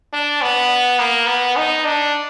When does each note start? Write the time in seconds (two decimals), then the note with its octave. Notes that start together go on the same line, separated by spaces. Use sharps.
0.13 D4
0.41 B3
0.99 A#3
1.27 B3
1.57 D#4
1.85 D4